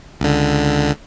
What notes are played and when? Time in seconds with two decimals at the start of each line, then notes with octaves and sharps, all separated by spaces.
0.20 C#2 D3